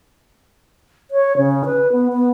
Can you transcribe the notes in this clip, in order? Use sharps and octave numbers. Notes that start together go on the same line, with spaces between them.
C#5
C#3
B4
B3
B3